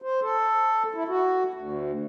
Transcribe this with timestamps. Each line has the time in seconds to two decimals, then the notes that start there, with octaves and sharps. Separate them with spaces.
0.02 C5
0.22 A4
0.94 E4
1.08 F#4
1.54 D2